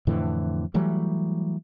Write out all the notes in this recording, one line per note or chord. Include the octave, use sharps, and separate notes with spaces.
F2 A2 D3 E3
E3 F#3 G3 A3